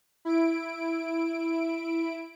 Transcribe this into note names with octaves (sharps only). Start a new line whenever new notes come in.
E4 D7